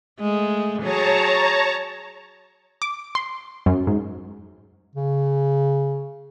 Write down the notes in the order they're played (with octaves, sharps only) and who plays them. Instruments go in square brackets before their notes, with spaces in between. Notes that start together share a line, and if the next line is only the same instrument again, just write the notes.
[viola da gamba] G#3 A3
[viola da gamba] F#3 G#4 [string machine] C#5 A5 A#5
[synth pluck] D6
C6
F#2
G#2
[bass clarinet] C#3